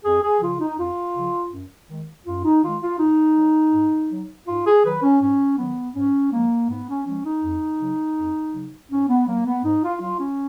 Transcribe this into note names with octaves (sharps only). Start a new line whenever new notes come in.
F2 G#4
G#4
C#3 F3 F4
D#4
F2 F4
C#3 F3
F#2
D#3 G#3
F#2 F4
D#4
D#3 G#3 F4
F4
G#2 D#4
F#3
G#2
F#3
G#2 F4
G#4
D#3 F#3 B4
C#4
G#2 C#4
D#3 F#3 B3
G#2 C#4
F3 G#3 A#3
G#2 B3
C#4
F3 G#3 C#4
D#4
F2
C#3 F#3
F2
C#3 F#3
G#2 C#4
B3
F#3 A#3
B3
G#2 D#4
F4
F#3 F4
C#4